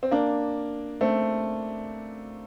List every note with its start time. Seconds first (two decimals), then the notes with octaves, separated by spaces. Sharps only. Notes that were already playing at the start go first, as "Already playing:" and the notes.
0.03 C4
0.11 A#3 D4
1.01 A3 C4